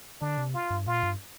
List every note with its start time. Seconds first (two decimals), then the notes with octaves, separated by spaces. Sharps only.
0.21 D3 D4
0.38 C3
0.54 F4
0.70 G2
0.87 A#2 F4
1.03 G2